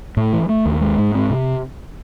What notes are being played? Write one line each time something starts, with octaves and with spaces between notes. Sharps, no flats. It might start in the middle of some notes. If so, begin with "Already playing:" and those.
A2
E3
A3
D#2
G#3
G#2
C4
C3